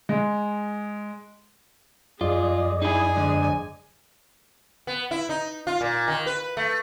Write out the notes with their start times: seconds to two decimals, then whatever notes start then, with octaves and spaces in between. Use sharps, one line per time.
0.09 G#3
2.21 F#2 F4 G#4 D5 D#5
2.82 D#4 E4 G#4 G#5
3.17 G#2 D3
4.87 B3
5.11 E4
5.29 D#4
5.67 F4
5.81 A#2
6.08 D#3
6.26 B4
6.57 A3